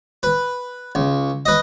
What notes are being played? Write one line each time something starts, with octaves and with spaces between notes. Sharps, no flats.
B4
C#2
B4 D#5